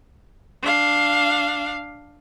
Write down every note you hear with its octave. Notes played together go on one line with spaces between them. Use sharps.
D4 F5